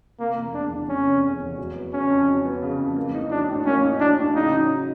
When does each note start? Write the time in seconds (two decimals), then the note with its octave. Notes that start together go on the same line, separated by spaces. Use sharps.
0.19 C3 A#3
0.37 F1
0.54 E2 D4
0.72 F1
0.89 C3 C#4
1.07 F1
1.24 E2
1.41 F1
1.58 F#3
1.75 B3
1.93 C#3 C#4
2.10 F2
2.27 F#3
2.45 B3
2.62 C#3
2.79 F2
2.96 A#3
3.14 D#4
3.31 F#3 D4
3.49 A2
3.65 A#3 C#4
3.83 D#4
4.00 F#3 D4
4.18 A2
4.35 C#3 D#4
4.53 F#3